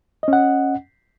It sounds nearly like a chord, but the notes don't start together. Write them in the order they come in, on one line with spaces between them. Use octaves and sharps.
D#5 C#4 F#5